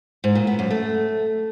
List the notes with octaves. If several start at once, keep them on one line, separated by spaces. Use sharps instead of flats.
G#2
A#2
B3
F#2
A3